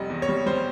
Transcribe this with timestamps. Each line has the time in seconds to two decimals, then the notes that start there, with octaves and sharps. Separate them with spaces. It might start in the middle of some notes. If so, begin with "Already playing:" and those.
Already playing: F1 G3 D#5
0.10 E2
0.22 C#5
0.29 G3
0.46 G3 C5